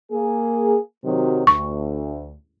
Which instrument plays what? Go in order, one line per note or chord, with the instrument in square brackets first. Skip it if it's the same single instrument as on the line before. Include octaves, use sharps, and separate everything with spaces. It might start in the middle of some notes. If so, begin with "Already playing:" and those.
[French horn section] A#3 G#4
C3 D#3 F#3
[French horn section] D2 [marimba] C#6